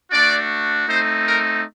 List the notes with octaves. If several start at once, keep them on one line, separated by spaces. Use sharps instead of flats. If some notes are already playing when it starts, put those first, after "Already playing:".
A3 D4 F#4 D5
A3 C4 D#4 C5
A#4